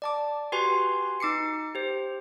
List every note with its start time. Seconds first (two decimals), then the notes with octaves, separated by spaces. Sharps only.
0.02 D5 A5 D6
0.52 F#4 G4 B4 G#5 C6
1.20 D#4 D6 C7 C#7
1.75 G4 C5